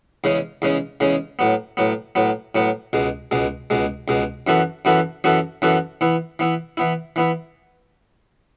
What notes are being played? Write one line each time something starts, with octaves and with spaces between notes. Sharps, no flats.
E2 C#3 G#3 C#4
E2 C#3 G#3 C#4
E2 C#3 G#3 C#4
A2 F#3 B3
A2 F#3 B3
A2 F#3 B3
A2 F#3 B3
C#2 B2 G#3
C#2 B2 G#3
C#2 B2 G#3
C#2 B2 G#3
F#2 E3 B3 F#4 A4
F#2 E3 B3 F#4 A4
F#2 E3 B3 F#4 A4
F#2 E3 B3 F#4 A4
E3 B3 E4
E3 B3 E4
E3 B3 E4
E3 B3 E4